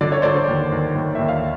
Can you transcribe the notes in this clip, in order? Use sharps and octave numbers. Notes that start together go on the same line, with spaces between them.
D3 D5
C#5
D3 C5 D5
D#2
D#2
D#2
D#2 E5
F5